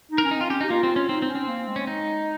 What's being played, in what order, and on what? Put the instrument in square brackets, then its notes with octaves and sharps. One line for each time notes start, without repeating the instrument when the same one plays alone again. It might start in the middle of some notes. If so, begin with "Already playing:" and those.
[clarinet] D#4
[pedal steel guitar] A#4
[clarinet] C#4
[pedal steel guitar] D#4
[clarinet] C4 [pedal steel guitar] F4
[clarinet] C#4 [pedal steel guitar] G4
[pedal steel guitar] D#4
[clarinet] G4
[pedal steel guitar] A#3 [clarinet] F4
[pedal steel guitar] C4
C#4
[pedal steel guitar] C4 [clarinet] D#4
[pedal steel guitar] C4
[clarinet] C#4
[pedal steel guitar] C4
[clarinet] A#3
G#3
[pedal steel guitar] C#4
D#4